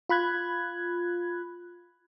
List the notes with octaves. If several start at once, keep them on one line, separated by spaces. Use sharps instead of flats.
F4 B5 F#6 G#6